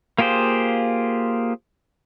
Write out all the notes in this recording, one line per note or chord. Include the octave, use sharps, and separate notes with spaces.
A#3 F4 G4 G#4 C5